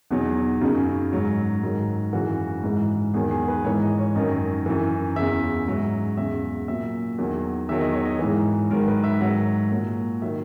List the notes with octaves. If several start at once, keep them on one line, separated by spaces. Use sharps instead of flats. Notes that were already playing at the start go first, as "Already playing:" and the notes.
E2 B2 F#3 D#4
F#2 C#3 F#3 D#4
G#2 F#3
G#2 D#3 F#3
F#2 C#3 E3 F#4
G#2 E3
E2 D#3 F#3 G#4
G#4
B4
G#2 E3 C#5
D#5
C#5
F#2 D#3 F#3 D#5
F#2 E3
E2 C#3 E3 E5
G#2 F#3
E2 C#3 F#3 E5
A#2 F#3 E5
E2 D#3 F#3
E2 D#3 F#3 E5
D#5
C#5
D#5
G#2 E3
G#2 D#3 F#3 A#4
B4
E5
G#2 F#3 F#5
A#2 F#3
D#3 F#3 E5